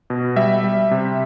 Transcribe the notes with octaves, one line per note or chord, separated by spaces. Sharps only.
B2
G3 E5
G3
C3